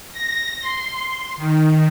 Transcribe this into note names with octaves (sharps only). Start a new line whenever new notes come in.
A#6
C6
D#3